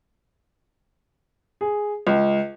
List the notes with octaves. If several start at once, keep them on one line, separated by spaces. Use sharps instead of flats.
G#4
C#2